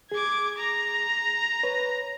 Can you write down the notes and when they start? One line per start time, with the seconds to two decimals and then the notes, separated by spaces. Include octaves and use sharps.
0.12 G#4 D6 G#6
0.58 A#5
1.63 B4 C#5